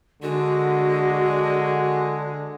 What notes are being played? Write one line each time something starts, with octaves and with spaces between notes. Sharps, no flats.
D3 G#3 F#4